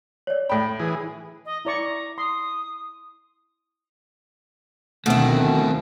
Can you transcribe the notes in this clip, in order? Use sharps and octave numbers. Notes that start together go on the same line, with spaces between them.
C#5 D5
A2 G5 B5
E3 G#4
D#5
E4 D5 A#5 C#6
C6 D#6
D2 B2 D#3 A3 C4 E4